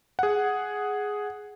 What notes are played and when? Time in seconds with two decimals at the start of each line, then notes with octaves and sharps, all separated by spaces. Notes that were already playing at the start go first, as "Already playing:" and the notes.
0.19 G#4 F#5